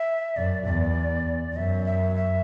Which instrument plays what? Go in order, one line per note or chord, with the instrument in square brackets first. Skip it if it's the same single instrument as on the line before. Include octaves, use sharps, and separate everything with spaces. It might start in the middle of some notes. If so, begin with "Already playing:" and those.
Already playing: [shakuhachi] E5
[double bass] F#2 [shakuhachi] D5
[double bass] E2
[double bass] F#2 [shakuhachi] E5
[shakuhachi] E5
E5